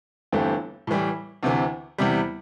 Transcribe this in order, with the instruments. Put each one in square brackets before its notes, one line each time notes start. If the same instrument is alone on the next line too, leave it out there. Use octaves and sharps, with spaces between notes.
[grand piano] G1 G2 E3 A3 C4
A2 E3 G3
D2 C3 E3
E2 C3 G3